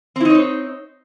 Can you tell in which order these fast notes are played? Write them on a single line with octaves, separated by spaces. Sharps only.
C4 E4 D#4 C#5 C5